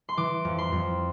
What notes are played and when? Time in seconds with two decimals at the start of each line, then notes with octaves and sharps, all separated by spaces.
0.09 C6
0.17 E3 D6
0.45 F2
0.58 C6
0.72 F2